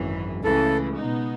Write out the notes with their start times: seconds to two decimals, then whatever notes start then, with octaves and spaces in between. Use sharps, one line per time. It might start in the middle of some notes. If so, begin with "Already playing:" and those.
Already playing: G#1 F#2 E3
0.44 C#2 C#3 E3 A3 A4
0.99 B2 G#3 B3 D#4